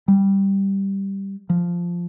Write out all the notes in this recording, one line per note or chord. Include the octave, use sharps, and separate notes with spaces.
G3
F3